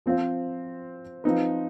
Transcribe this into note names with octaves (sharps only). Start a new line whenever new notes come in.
F3 C4 F4 C5
F3 C4 D#4 B4